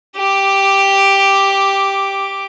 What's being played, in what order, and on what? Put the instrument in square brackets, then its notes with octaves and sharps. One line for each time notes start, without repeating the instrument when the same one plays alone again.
[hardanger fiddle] G4 D6